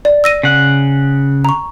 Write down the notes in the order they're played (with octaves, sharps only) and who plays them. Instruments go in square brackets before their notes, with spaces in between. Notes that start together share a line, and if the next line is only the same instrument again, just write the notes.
[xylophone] D5
E6 A#6 D#7
[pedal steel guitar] C#3 F#5
[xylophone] A#5 C#6